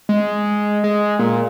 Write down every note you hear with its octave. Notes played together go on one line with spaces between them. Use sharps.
G#3
G#3
A#2